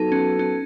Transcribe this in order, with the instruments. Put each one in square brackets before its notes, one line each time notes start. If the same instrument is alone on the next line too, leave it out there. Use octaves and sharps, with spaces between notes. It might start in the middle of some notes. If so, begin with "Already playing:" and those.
Already playing: [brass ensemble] F#3 B3 F#4 A4 [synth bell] D#4
[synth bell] C#4
C#4